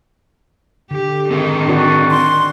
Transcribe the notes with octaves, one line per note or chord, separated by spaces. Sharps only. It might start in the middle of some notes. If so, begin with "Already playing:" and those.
D3 G4
D#3 C4 G#4 A#4
D4 F#4 D5
C6